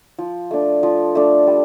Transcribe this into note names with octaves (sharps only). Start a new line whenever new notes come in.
F3
A3 D4
F3
A3 D4
G3